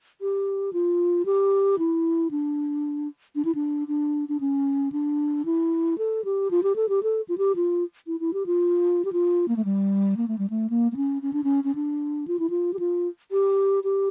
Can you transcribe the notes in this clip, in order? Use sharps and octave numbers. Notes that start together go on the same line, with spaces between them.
G4
F4
G4
E4
D4
D4
E4
D4
D4
D4
C#4
D4
E4
A4
G4
F4
G4
A4
G4
A4
F4
G4
F4
E4
E4
G4
F4
G4
F4
A#3
A3
G3
A#3
A3
G3
A3
A#3
A#3
C#4
C#4
D4
C#4
C#4
D4
F4
E4
F4
G4
F4
G4
G4